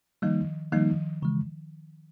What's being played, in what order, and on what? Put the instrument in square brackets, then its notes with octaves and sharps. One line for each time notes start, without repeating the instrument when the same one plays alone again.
[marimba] D#3 F3 [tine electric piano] G3 A#3 D#4
[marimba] D#3 F3 [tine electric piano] G3 A#3 D#4
[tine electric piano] C#3 E3 G#3